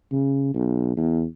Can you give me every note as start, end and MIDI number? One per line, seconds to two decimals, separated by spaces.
0.12 0.52 49
0.54 0.93 35
0.97 1.24 40